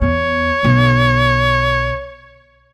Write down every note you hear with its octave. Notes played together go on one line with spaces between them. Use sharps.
E2 B3 C#5
B1 D3